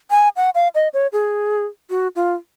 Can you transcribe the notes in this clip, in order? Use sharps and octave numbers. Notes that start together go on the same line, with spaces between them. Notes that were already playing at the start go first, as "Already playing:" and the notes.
G#5
F#5
F5
D#5
C#5
G#4
F#4
F4